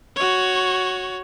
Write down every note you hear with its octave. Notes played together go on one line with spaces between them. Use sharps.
F#4 C#5